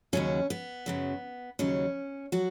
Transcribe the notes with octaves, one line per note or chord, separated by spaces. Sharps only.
D#2 C#3 F#3 C#4
B3
F#2 C#3 F#3
D#2 C#3 F#3 C#4
F#3 F#4